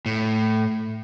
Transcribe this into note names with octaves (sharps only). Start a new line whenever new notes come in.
A2